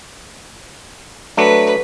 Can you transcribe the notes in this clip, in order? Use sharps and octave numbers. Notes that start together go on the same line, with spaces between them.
F#3 A3 D4 B4